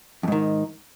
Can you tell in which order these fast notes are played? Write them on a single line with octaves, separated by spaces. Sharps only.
F2 G#2 D#3